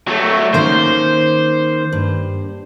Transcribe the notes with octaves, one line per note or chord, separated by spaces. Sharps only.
F#3 A3
D#3 A#3 C#4 C5
G2